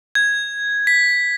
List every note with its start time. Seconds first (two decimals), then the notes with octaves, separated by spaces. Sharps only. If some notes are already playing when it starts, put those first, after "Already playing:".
0.15 G#6
0.87 B6